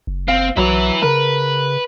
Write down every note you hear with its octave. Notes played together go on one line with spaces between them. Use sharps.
F#1
C4 F5
B1 F#3 E4 B4
C#3 A#4 B4